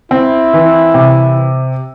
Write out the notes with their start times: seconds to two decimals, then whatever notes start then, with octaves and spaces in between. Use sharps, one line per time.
0.11 C4 E4
0.53 E3
0.94 C3